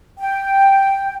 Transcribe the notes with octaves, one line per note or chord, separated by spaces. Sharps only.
G5